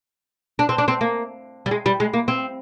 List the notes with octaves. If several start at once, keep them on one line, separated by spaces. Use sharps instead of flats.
D4
C4
D4
C4
A#3
G3
G#3
G3
G#3
A#3
C4